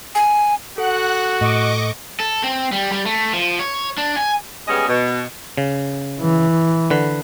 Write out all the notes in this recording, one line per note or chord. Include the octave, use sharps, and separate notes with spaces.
G#5
F#4 A4 F#5 F#6
A2 D#5 C#6 D6
A4
C4
G3
G3
A3
F3
C#5
D4
G#5
G3 G#3 B3 C#4 G#4 D#5
B2
C#3
E3
D3 B4